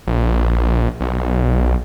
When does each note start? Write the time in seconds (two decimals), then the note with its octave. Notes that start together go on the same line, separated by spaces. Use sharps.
0.07 A#1
1.01 B1